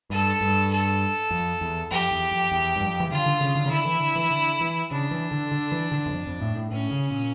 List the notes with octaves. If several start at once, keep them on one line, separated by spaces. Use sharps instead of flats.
G2 A4
G2
A4
F2
E2
F2 G4
E2
F2
E2
G2
F2
E3
D3 F4
D3
C#3
D3
C#3
D3 E4
E3
D3
E3
D3
E3
C#3 D4
E3
D3
D3
E3
D3
E2
F2
F2
A2
A2
A2 C#4
C#3
A#2